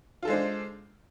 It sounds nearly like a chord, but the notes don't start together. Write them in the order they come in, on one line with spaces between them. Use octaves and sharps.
F4 A4 G#3 C5 D4